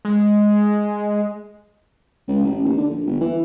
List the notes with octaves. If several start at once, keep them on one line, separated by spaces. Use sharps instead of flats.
G#3
C#2
A1
D#2
D3
A#1
G1
E3